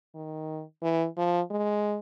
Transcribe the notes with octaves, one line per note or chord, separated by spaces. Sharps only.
D#3
E3
F3
G#3